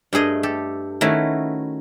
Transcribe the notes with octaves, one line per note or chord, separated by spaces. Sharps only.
G2 A3 G#4 D#5
G4 A4
D#3 A3 C#4 E4 F#4 B4